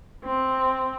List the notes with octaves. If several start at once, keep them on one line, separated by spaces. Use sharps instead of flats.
C4